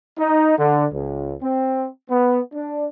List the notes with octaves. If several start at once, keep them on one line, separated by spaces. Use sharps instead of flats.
D#4
D3
C#2
C4
B3
D4